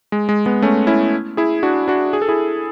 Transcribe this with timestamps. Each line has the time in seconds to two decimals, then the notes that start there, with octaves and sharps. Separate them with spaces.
0.12 G#3
0.29 G#3
0.46 G#3 B3
0.62 A3 C#4
0.87 C#4 E4
1.37 E4 G#4
1.63 D4 F#4
1.88 D4 F#4
2.13 G#4
2.22 A4
2.29 E4 G#4